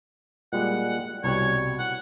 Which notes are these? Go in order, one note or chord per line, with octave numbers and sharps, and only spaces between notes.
A#2 G3 G#3 F#5
C2 B2 G3 C#5
F#5